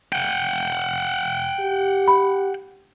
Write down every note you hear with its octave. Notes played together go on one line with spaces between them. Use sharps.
F#5 G5
G4
B5